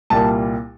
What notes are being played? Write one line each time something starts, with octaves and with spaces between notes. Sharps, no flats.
C2 A#2 G3 A#3 A5